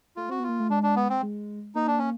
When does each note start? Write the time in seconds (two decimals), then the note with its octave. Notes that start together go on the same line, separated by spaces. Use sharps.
0.16 A3 F4
0.29 C4 F#4
0.40 B3 F4
0.49 A#3
0.60 A3
0.70 G#3 D4
0.83 D4
0.96 B3
1.10 C4
1.22 G#3
1.75 A#3 D#4
1.87 D4
1.98 C#4